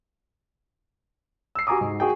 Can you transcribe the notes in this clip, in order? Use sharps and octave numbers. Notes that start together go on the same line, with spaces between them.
E6 C7
F#4 G4 G#5 A#5 D6 D#6
G#2
F#4 G#4 G5